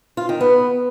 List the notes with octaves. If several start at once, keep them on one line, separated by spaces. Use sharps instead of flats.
F4
D#3
B3